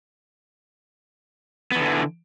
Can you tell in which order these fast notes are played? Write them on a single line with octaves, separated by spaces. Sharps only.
B3 E3 D3